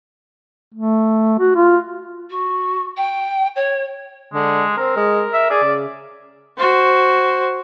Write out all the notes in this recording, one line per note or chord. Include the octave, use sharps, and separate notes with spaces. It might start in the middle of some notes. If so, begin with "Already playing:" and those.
A3
F#4
F4
F#4
G5
C#5
D3 G#3
C4 A#4
G#3
E5
G#4 D5
C#3
F#4 C5